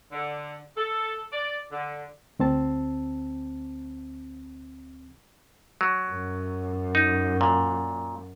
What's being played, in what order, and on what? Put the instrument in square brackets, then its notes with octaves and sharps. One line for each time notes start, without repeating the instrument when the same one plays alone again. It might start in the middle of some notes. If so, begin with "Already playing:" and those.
[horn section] D3
A4
D5
D3
[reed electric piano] D2 C4 A5
[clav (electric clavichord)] F#3
[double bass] F#2
[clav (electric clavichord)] D#4
A#2